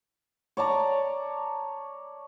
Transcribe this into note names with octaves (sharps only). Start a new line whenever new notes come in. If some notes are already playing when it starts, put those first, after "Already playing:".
C#5 D5 A5 A#5